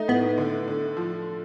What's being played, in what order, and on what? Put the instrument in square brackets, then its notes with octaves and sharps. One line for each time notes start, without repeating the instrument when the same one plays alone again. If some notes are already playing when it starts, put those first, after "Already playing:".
Already playing: [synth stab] A3 [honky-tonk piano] D#4
[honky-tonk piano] A2 [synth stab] B3
[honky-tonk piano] D3
D3
F3